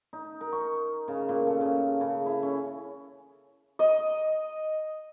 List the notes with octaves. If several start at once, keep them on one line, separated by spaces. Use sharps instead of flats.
D#4
A#4
C#6
C#3
A#2
A4
C#3
C#3
E4
C#4
D#5